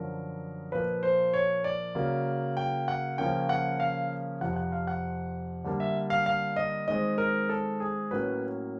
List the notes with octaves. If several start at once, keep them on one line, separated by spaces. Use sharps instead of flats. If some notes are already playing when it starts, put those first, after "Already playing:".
Already playing: F#2 D3 F3 A#4
A#2 F3 A#3 B4
C5
C#5
D5
C#3 F#3 A#3
G5
F#5
C#3 F3 A#3 C#4 G5
F#5
F5
F2 C3 F3 F#5
F#5
F5
F#5
D3 G3 A#3 D4
E5
F5
F5
D#5
D#3 G#3 C4 D#5
A#4
A4
G#4
A2 F#3 A#3 C#4 B4